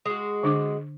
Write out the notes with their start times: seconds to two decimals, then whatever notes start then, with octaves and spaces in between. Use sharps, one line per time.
0.06 G#3 F#4
0.43 D3 D4 D6